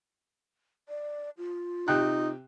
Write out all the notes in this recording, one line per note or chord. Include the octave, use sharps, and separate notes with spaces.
D5
F4
C3 D#4 G5 F#6